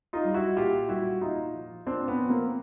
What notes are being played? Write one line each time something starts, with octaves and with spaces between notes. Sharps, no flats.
D#4 F4
G3
E4 F#4
A#2 F4 G4
G3 E4 F#4
A#2 D#4 F4
F3
A#2 C4 D4
B3 C#4
F3
A#3 C4